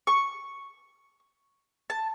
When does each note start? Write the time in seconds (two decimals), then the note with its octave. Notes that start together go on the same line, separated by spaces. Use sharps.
0.07 C#6
1.90 A5